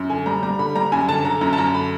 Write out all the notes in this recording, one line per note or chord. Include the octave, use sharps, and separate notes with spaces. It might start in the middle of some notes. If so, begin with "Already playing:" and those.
Already playing: F#2
D3 G#5
G3 A#5
G3 A#5
D3 B5
G3 A#5
F#2 G#5
D3 A5
D3 A#5
F#2 A#5
A5
F#2 A#5
D3 B5